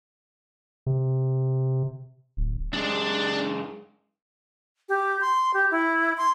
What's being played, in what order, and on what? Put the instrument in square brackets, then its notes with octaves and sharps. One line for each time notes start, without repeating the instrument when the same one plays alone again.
[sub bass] C3
D1
[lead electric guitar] F#2 G#3 [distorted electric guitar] D4 D5
[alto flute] G4
C6
G4
E4
C6